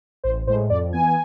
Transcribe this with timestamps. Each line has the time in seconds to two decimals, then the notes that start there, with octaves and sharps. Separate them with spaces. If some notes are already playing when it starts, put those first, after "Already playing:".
0.24 A1 C5
0.47 A2 G#3 C5
0.70 F2 D5
0.93 E3 B3 G#5